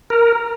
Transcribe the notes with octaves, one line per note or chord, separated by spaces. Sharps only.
A#4